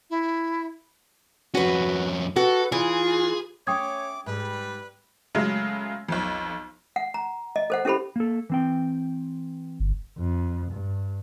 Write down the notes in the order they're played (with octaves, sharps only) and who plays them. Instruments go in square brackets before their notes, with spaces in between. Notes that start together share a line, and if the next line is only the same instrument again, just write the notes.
[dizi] E4
[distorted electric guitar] F2 C#4 [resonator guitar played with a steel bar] F#4 B4
[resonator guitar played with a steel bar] F#4 [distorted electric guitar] A4 [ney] B4
[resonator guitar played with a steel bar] E3 [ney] F4 [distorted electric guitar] G#4
[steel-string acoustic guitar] A3 C#4 [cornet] C#5 [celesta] G5 D#6 G#6 [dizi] D6
[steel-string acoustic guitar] G#2 [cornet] G3 [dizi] B4
[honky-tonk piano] C#3 F#3 G#3 A3
B1 F2
[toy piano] F#5
A#5
D#5
A4 C5 F#5
C#4 E4 G4 A4 C5 B5
[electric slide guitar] A#3 A4
E3 C4 G5
[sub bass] G1
[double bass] F2
G2